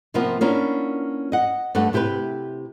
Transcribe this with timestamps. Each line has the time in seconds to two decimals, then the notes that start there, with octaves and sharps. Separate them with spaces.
0.14 C3 F3 A#3 B3 F4
0.41 A#3 B3 C#4 D4 E4 F4
1.32 D#5 F#5
1.75 G2 A3 A4 F#5
1.93 C3 E4 G4 A#4 B4